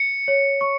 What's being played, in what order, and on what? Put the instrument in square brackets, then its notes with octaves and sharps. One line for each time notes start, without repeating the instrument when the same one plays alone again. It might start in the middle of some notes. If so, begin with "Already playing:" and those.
Already playing: [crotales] C#7
[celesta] C#5
C#6